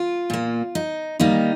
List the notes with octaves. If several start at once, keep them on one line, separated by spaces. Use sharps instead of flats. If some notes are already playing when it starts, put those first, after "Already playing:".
Already playing: F4
A#2 A#3
D#4
D#3 G3 A#3 D#4